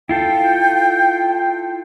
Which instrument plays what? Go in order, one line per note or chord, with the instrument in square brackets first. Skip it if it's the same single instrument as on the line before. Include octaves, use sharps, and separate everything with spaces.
[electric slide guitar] E4 F4 A4 [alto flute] G5